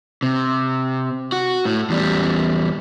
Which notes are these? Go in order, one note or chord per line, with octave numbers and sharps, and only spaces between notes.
C3
F#4
A2
E2 G3